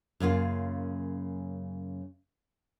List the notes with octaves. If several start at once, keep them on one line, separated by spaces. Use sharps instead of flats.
F#2 C#3 A#3 F4